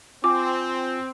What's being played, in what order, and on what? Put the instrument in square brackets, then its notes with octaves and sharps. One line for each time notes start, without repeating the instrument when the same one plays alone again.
[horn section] C4 [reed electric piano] F4 G#5 [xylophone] D6